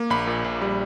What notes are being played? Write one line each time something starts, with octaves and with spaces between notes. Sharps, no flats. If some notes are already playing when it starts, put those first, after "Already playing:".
Already playing: A#3
A#1 B5
A#2
A#1
G3